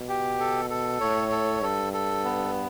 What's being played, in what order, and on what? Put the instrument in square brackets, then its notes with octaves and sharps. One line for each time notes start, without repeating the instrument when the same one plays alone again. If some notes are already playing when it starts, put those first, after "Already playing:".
Already playing: [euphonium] B2
[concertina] G4
A4
A4
[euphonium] A2 [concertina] C#5
[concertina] A4
[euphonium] G2 [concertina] A4
[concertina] A4
B3